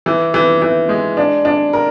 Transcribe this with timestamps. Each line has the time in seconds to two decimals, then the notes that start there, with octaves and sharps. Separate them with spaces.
0.06 E3
0.34 E3
0.62 E3
0.89 G#3
1.17 D4
1.45 D4
1.73 A#4